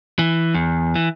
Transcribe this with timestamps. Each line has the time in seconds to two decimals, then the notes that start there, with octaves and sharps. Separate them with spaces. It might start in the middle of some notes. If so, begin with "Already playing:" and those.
0.19 E3
0.55 E2
0.95 E3